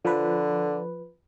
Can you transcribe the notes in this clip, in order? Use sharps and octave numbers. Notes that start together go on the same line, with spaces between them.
D3 F3 B4